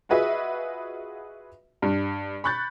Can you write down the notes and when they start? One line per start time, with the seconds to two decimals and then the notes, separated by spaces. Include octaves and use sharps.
0.09 F4 F#4 G#4 B4 D#5 E5
1.82 G2
2.44 B5 C#6 F#6 G6 A6